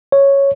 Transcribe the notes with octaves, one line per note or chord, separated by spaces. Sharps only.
C#5